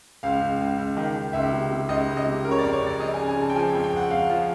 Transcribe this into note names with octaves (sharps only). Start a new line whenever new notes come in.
C#2 F5
C#2
C#2
C#2
D#3
D#3
C#2 E5
C3
C3
C#2 D#5
C#2
D#5
C3
C#3 A#4
C#5
D5
F2
C#5
F2
D5
F2 D#5
G#5
C#3
G#5
C#3
A5
G5
F3 G#5
G5
F2
G5
F2 F#5
F2 F5
F3